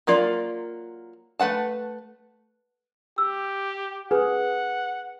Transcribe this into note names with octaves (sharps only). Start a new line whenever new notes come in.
F#3 A#3 F4 D5
A3 B4 F#5 A5
G4 E6
G#4 B4 F#5